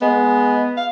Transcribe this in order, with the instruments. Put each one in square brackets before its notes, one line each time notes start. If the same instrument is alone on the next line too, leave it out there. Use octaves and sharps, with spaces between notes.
[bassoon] G#3 [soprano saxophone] B3
[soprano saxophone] F5